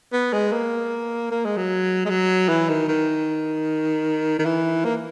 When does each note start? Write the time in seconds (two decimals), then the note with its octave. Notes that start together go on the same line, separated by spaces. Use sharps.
0.13 B3
0.33 G#3
0.52 A#3
1.31 A#3
1.45 G#3
1.57 F#3
2.05 G#3
2.10 F#3
2.49 E3
2.69 D#3
2.88 D#3
4.39 D#3
4.45 E3
4.85 A#3